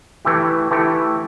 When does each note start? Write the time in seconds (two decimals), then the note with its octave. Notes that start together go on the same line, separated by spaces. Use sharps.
0.25 E3 A3 E4 G4
0.71 E3 A3 E4 G4